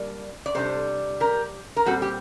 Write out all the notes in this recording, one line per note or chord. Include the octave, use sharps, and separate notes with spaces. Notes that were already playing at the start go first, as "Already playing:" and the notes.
Already playing: G3 A#3 D4
D5
C3 G3 D4 A4 C5
G4 A#4
A#4
A#2 G3 C4 F#4 A4
G4